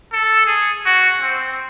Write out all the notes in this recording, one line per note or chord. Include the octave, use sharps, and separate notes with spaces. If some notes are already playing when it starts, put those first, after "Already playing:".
A4
G#4
F#4
C4